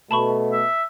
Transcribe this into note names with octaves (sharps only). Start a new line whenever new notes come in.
B2 A3 A5 B5 C#6
E5